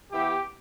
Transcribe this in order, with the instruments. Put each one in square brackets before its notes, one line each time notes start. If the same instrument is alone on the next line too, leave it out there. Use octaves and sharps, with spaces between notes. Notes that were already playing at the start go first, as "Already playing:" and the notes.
[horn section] E3 B3 E4 G4